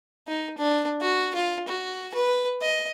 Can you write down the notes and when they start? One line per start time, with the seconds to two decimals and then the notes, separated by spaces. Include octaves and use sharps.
0.28 D#4
0.58 D4
1.01 F#4
1.35 F4
1.68 F#4
2.14 B4
2.61 D#5